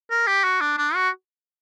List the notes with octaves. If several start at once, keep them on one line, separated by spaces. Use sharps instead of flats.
A#4
G4
F#4
D4
D4
F#4